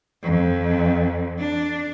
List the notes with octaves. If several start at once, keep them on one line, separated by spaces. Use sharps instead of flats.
F2
D4